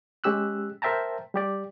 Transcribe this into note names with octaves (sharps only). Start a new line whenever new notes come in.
G#3 C#4 G4 E6 F#6
A#4 C5 E5 G5 A5 A#5
G3 G4 D5